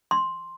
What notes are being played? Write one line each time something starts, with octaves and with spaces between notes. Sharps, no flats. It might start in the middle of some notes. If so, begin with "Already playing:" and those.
C6